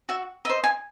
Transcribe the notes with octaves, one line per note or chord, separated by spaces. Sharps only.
F#4 E5
C5 D#5 E5
G#5